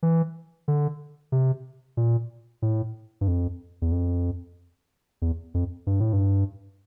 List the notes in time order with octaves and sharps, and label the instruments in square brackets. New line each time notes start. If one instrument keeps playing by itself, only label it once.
[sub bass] E3
D3
C3
A#2
A2
G2
F2
E2
F2
E2
F2
G2
A2
G2